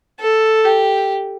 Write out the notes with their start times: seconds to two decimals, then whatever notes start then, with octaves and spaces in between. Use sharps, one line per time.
0.20 A4
0.65 G4